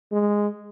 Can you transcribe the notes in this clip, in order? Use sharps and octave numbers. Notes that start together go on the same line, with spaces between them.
G#3